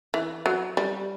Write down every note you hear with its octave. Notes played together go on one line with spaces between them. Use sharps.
E3
F#3
G3